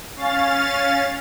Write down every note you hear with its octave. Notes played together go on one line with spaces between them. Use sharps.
C#4 F5 A6